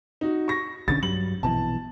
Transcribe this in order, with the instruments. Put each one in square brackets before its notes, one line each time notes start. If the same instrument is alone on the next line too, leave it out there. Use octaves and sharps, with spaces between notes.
[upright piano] D#4 F#4
C#6 A#6
[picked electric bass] B1 D3 C#4 [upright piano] A6
[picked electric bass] G2 F#3 G3 [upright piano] F#7
[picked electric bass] A#1 B2 E3 [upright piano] A5